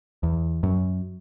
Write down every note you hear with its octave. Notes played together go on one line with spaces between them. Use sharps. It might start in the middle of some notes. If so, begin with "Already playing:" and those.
E2
F#2